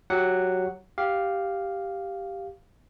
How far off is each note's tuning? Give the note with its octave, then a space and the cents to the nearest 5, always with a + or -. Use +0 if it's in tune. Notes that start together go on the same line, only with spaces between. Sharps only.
F#3 +0 G4 -10 F#5 +0
G4 +0 F5 +0